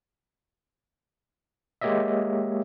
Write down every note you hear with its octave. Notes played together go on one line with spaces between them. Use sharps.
G#3 A#3 G4 C#5 D#5 E5